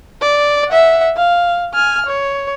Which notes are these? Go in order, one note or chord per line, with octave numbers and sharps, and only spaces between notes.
D5
E5 F#5
F5
G#5 F6
C#5